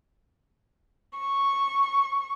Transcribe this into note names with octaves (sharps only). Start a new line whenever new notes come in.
C#6